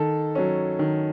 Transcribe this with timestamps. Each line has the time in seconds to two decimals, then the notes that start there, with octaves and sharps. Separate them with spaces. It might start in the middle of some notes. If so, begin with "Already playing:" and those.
Already playing: D#3 A4
0.35 F#3 C#4
0.79 D#3